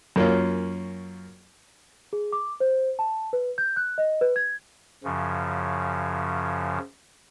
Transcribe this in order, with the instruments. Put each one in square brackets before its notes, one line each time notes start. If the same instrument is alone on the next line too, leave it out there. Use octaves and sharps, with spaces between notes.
[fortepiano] F#2 A#3 C#4 F4
[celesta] G#4
D6
C5
A5
B4
G6
F#6
D#5
B4
G#6
[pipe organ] F#2 C#3 F3